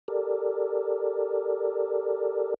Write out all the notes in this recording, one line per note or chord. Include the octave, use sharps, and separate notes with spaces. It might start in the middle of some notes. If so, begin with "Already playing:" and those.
G4 A4 A#4 D5